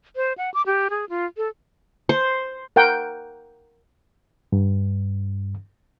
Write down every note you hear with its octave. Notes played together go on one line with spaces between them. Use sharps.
C5
F#5
D6
G4
G#4
F4
A4
C5
A#4 F#5 G5
G2